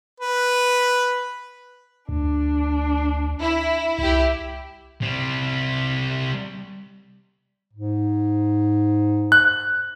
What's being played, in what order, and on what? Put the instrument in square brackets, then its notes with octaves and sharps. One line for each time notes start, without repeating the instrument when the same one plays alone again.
[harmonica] B4
[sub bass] D2 [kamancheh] D4
[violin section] E4
[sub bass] C2 [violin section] E4 G4
[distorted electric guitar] C3 G3
[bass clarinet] G#2
[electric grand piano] F#6